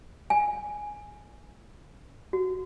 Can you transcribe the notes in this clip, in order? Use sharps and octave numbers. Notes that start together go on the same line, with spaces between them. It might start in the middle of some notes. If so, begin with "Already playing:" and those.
G#5
F#4